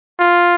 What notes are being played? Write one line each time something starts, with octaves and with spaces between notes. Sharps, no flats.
F4